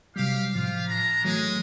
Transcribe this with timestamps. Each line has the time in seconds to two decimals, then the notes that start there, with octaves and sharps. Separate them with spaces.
0.16 C3 F#3 G3 G4 F5
0.55 A2 F3 F4 G4 F5
0.88 D4 A#5
1.25 E3 F#3 G#3 A3